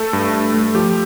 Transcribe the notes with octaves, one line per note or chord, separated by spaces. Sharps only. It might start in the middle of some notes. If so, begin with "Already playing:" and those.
Already playing: A3 A4
G2
G2
A3
F3 G4